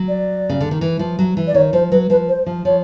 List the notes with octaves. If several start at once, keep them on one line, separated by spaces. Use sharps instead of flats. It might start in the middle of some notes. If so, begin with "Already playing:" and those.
Already playing: F#3
D5
C#3
D3
D#3
E3
F3
F#3
E3
D5
D#3 C#5
F3 C5
F#3 B4
F3 B4
C5
F3
F3 C#5